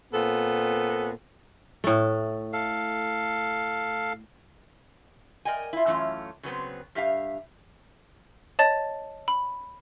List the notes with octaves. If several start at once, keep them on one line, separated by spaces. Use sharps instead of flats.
A#2 B3 C4 A4
A2 A3
A4 F5
A#4 D5 D#5 G5 G#5
E4 F4
F#2 E3 A3 C#4 F4
C#3 F#3 B3 C4
G2 G4 E5 F5
C#5 D#5 A5 A6
B5